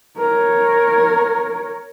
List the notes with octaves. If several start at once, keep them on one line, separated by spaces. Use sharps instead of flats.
A#4 C#5